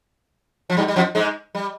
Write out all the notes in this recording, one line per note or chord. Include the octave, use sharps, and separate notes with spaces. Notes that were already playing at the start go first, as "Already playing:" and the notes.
F3
G2 G3
G3
F2 F3
G#2 G#3
G3